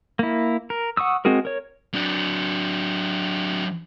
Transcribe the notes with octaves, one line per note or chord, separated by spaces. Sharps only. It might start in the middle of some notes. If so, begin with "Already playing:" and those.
A#3 E4
A#4
F#5 C#6 D#6 E6
G#3 C4 F#4 G#4 A#4
A#4 C#5
F#3 D4